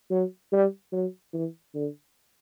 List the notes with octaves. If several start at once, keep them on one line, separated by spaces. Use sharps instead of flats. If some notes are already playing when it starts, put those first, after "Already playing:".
F#3
G3
F#3
E3
D3